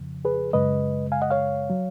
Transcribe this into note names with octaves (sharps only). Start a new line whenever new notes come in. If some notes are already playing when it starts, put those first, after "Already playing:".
Already playing: F2 C#3 F3
G#4 B4
F#2 C#3 G#3 B4 D#5
F5 G#5
D#5 F#5
C#5 F5
F#3